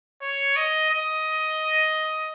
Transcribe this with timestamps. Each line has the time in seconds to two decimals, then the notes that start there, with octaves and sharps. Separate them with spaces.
0.21 C#5
0.56 D#5
0.91 D#5